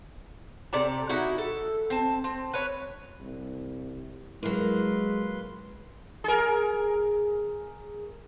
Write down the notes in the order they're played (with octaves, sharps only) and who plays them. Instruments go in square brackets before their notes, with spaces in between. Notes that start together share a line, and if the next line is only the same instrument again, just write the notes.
[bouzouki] C3 A4 D5 A#5
D#4 E4 F#4
A4
C4 A5
C4
B4 C#5
[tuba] C2
[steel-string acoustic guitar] F#3 A#3 [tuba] G#3 [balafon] E4 A#4 [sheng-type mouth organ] B4 C6
[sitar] G#4 A#4